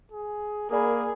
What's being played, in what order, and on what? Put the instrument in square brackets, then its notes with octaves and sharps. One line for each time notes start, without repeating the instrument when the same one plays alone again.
[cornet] G#4
[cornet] A#3 [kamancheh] G#4 [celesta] A#4 D5 B5